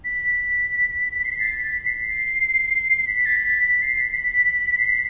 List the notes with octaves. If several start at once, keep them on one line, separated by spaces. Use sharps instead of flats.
B6
C7
A6
B6
B6
C7
B6
A6
B6
B6
C7
B6
B6
B6
C7
B6